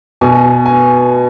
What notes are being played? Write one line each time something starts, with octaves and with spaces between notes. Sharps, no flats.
B2 G#5
G#5